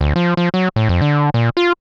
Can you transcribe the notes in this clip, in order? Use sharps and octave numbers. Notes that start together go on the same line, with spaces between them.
D2
F3
F3
F#3
A2
F2
D3
A#2
F4